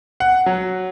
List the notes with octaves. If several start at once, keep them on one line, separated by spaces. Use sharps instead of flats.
F#5
F#3